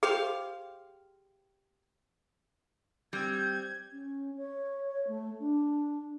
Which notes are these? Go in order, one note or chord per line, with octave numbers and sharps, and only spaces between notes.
G4 G#4 C5 F5
G3 C4 G6 G#6
C#4
C#5
A3
D4